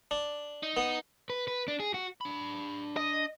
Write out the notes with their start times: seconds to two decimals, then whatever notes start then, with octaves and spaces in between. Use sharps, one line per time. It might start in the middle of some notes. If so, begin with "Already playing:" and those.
0.11 D4
0.63 D#4
0.77 B3
1.30 B4
1.48 B4
1.68 D4
1.80 G#4
1.94 F#4
2.21 D4 B5
2.97 D#5